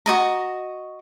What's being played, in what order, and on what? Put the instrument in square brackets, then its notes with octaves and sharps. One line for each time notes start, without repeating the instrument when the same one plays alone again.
[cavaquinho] F#4 D#5 A#5